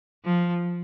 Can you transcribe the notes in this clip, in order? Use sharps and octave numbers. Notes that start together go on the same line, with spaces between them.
F3